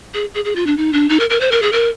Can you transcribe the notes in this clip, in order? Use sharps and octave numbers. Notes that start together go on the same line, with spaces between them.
G#4
G#4
G#4
F4
D4
D#4
D4
D#4
A#4
A#4
C5
A#4
G#4
A#4